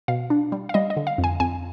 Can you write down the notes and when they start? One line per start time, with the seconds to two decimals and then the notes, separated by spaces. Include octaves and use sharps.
0.08 B2 F5
0.30 D4
0.52 G3
0.69 F5
0.74 G3 D#5
0.90 D#5
0.97 D3
1.07 F5
1.18 F2
1.24 G#5
1.40 F2 G#5